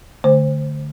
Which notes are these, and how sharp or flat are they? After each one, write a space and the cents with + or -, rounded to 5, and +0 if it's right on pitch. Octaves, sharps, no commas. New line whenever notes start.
D3 +0 A3 +0 C5 +0